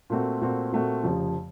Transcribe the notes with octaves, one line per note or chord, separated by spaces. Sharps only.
A#2 A3 C4 F#4
A#2 A3 C4 F#4
A#2 A3 C4 F#4
F1 F2 C#3 F3